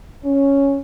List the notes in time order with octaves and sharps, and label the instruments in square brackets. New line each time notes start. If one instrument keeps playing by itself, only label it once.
[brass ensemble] C#4